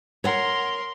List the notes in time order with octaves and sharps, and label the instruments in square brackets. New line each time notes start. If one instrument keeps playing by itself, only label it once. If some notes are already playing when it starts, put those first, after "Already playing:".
[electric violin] A#4 C6 [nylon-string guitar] C#5 F#5